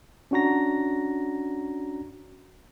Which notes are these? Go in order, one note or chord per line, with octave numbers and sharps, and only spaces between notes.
C#4 D4 F#4 F#5 A#5 A#6